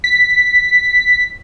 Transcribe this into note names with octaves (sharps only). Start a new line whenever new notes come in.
B6